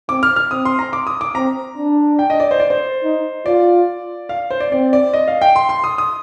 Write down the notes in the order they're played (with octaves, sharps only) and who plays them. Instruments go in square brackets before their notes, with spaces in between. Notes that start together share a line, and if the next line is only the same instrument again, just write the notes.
[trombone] C4 [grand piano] D6
[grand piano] F6
F6
[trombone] C4 [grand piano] D#6
[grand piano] C6
A#5
D6
D#6
D6
[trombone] C4 [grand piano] A#5
[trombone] D4
[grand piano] G5
D#5
D5
C5
D5
C5
[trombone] D#4
[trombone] F4 [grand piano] D5
[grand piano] F5
C5
D5
[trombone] C4 [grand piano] D5
[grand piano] D5
D#5
F5
G5
C6
C6
D#6
D#6